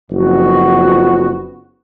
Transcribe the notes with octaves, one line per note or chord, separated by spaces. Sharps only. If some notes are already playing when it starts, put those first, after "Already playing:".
F#1 F2 F3 B3 F#4